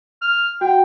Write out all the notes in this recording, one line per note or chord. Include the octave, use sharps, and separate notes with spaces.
F6
F#4 F#5 G5